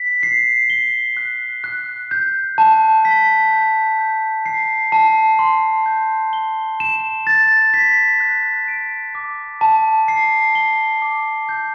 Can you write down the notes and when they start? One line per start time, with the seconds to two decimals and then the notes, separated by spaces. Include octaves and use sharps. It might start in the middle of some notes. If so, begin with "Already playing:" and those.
Already playing: B6
0.23 C7
0.70 G7
1.17 F#6
1.64 F#6
2.11 G6
2.58 A5
3.05 B6
3.51 G6
3.99 G6
4.46 C7
4.92 A5
5.39 C6
5.86 G6
6.33 G7
6.80 E7
7.27 A6
7.74 B6
8.20 F#6
8.68 D7
9.15 D6
9.61 A5
10.08 C7
10.55 G7
11.02 D6
11.49 G6